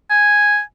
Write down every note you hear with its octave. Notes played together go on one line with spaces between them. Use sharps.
G#5